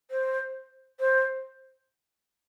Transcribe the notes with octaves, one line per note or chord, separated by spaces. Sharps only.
C5
C5